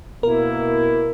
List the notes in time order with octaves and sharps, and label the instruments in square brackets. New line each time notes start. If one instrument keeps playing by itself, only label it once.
[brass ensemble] B2 A#3 E4 [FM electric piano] A#4